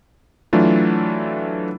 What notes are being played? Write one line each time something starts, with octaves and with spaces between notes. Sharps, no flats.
E3 F#3 A3 D4 F4